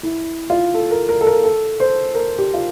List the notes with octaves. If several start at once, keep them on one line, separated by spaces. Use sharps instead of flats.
E4
F4
A4
A#4
A#4
A4
A#4
A4
C5
A#4
G4
F4